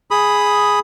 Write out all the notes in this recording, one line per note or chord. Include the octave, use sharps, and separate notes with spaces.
G#4 B5 D#6